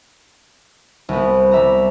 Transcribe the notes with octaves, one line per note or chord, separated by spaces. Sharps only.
C2 B3
G3 E5 A#5